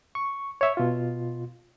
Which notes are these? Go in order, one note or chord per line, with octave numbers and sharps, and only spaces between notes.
C#6
C#5 E5
B2 F4